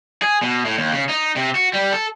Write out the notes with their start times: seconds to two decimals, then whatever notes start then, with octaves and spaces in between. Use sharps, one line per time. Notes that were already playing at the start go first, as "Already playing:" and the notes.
0.22 G#4
0.42 B2
0.65 A2
0.78 D#2
0.93 C#3
1.09 D#4
1.36 C3
1.55 F#4
1.73 G3
1.92 A4